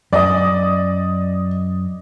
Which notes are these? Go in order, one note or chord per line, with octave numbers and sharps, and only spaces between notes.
F#2 D5 D#5 D6 D#6